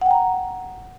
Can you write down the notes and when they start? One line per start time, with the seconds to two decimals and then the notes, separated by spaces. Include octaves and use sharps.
0.01 F#5
0.06 G5
0.11 A#5